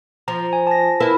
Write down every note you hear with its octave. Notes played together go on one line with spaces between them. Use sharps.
F3 A#5
G#5
A5 A#6
E4 F4 A#4 B4